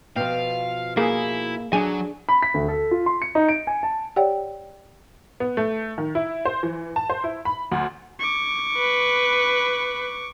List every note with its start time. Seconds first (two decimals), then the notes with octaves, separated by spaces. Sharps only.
0.16 B2 F3 F5 G5
0.97 A#3 E4 G#4 F5 G#5
1.73 F#3 D4 G#4 G#5
2.29 B5
2.43 B6
2.54 D2
2.68 A4
2.91 F4
3.06 C6
3.22 C#7
3.35 D#4
3.49 D7
3.67 G#5
3.83 A5
4.16 G4 C#5 D5 F#5 G5
5.40 B3
5.57 A3
5.98 D#3
6.15 E4
6.45 C5
6.63 E3
6.96 A5
7.10 C5
7.24 E4
7.45 B5
7.72 D2
8.19 C#6 D6
8.77 B4